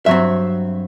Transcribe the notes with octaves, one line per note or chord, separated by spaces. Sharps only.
G2 F#3 C4 E5